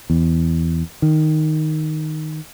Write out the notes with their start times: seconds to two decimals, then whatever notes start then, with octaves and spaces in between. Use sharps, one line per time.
0.10 E2
1.02 D#3